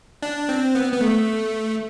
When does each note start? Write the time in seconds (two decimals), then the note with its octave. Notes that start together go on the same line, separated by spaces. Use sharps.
0.22 D4
0.49 C4
0.75 B3
0.93 B3
1.01 A3